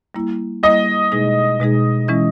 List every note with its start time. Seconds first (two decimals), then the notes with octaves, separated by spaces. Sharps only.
0.14 G3 A#3 E4
0.63 G3 A#3 E4 D#5
1.12 B2 G#3 D#4 G#4
1.60 B2 G#3 D#4 G#4
2.08 E3 G#3 C#4 E4